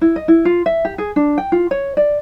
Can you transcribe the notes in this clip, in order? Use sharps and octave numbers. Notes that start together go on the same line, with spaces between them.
E4
D#5
E4
F4
E5
G4
G#4
D4
G5
F4
C#5
D5